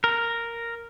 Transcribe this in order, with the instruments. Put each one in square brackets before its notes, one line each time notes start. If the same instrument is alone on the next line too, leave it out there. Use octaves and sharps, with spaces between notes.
[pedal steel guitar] A#4